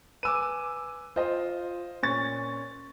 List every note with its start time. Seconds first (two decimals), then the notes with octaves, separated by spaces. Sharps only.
0.23 B4 G#5 D6 E6 D#7
1.16 F4 C5 D#5
2.03 A#2 C#4 C#6 A6